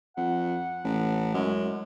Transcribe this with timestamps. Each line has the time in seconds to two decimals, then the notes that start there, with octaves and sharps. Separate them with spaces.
0.17 F2 F#5
0.84 A1
1.34 F#2 G#3